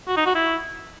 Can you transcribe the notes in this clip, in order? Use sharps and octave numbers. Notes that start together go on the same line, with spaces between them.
F#4
D#4
F#4
E4